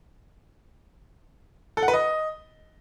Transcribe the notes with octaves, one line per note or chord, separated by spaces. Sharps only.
A4
F#5
B4
D#5